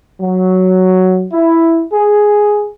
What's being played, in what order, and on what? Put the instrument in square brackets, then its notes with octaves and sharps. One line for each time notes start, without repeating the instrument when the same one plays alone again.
[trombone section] F#3
E4
G#4